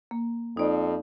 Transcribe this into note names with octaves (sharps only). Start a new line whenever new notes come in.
A#3
F2 D#4 D5